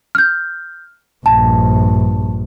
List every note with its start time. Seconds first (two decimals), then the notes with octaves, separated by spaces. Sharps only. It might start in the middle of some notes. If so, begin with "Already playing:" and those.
0.15 F6 G6
1.26 A#1 G2 A5